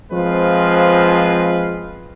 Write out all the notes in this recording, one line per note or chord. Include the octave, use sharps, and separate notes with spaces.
F3 G#3 C4 F4 B4